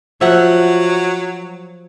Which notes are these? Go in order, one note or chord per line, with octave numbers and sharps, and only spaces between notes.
F3 F#3 E5 F#5